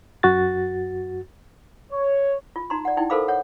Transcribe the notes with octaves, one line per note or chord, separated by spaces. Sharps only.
F#2 F#4 A6
C#5
F4
D#4 F#4 A#5 C6
D5 F#5
D#4 E4 G5
A4 A#4 C5 F5 B5 D6
C#5 F#5